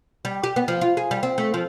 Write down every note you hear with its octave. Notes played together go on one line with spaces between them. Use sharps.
G3
G4
B3
F3
F4
G#4
G3
C4
A3
F3